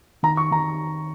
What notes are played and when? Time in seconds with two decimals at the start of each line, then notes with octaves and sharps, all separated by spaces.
0.23 D#3 A#5
0.37 C#6
0.51 D#3 A#5